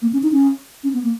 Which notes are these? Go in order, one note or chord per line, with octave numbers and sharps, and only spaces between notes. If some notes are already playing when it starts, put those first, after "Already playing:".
A#3
C#4
D#4
C#4
C#4
B3
A#3